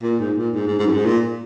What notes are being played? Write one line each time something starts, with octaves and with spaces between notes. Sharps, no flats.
A#2
G#2
A#2
G#2
G#2
G#2
F#2
G#2
A#2